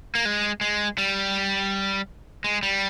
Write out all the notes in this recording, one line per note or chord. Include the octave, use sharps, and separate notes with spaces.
A#3
G#3
G#3
G3
G#3
G3